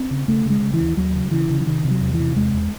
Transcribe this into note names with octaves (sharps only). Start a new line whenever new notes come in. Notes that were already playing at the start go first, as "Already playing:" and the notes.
Already playing: C4
C#3
C#3 A3
C#3 G#3
C#3
E3
D#2
D#2 F#3
C#3
C#3 E3
C#3
E3
C3 D#3
C3
F#3
E2
E3
C3
E2 G#3
E2